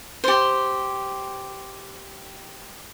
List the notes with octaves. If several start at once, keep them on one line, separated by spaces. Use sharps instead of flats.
G4 C5